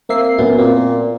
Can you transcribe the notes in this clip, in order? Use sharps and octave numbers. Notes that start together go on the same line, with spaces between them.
A#3 C4 E5 C7
F#2 A#2 B3 E4
A#2 C4